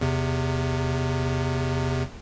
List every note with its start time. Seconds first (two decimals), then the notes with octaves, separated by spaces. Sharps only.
0.01 E2 C3